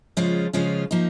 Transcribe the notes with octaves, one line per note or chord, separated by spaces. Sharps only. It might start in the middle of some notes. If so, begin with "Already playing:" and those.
C#3 F3 G#3 C#4 F4
C#3 F3 G#3 C#4 F4
F3 A#3 D#4